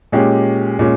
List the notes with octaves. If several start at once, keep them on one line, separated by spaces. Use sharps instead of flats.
A#2 G#3 C#4 G4
A#2 G#3 C#4